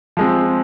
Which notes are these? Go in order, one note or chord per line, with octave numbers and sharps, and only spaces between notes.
F3 G#3 C4